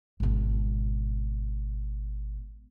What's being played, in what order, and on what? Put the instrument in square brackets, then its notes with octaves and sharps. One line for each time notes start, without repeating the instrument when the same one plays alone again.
[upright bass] G#1 B2